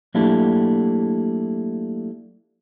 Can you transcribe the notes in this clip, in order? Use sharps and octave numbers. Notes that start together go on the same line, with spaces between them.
F#3 A3 A#3 D4 E4 G4